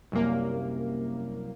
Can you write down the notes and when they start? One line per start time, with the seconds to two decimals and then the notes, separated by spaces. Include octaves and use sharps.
0.12 C2 F#2 C3 A#3